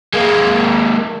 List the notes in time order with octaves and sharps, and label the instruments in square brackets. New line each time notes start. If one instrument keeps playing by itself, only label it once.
[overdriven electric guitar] G#3 A#3